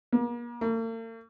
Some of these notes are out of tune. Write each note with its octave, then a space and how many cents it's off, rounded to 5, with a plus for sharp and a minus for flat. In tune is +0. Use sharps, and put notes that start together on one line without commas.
A#3 +40
A#3 -45